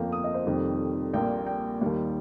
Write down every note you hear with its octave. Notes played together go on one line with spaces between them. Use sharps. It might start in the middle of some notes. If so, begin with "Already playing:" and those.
Already playing: G1 F2 F3 A#3 G5
D#6
D#5
C5
F1 F2 D#3 G3
A#1 A#2 G3 A#3 G5
G5
D#2 D#3 G3